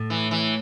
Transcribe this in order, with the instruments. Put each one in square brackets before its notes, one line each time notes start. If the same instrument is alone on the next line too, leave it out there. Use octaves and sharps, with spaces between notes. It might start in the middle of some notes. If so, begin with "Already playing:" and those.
Already playing: [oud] A2
[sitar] E3
E3